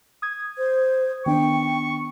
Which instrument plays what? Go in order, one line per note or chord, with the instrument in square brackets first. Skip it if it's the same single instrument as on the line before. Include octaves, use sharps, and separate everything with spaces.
[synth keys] D#6 G#6
[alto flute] C5
[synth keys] D#3 B3 D4 [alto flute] G5 [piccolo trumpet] C#6